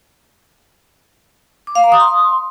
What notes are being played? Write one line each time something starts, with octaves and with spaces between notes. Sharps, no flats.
D6
F5
A#5
D#6
C6